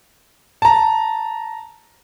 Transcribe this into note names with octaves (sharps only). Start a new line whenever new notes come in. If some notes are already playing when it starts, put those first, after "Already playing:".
A5 A#5